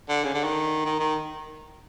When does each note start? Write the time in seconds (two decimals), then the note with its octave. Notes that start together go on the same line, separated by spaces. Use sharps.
0.09 D3
0.24 C#3
0.34 D3
0.44 D#3
0.85 D#3
1.00 D#3